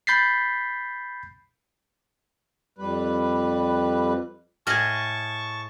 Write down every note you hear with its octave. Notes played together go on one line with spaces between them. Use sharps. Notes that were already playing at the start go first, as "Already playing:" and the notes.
B5 G6 A6 B6 C7
F2 G3 B4
A2 G#4 D#5 A5 C#6 F6 G#6